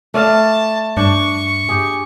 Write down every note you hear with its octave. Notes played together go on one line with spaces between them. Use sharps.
A3 D5 F5 A5
G2 D4 C#6
G4 G#4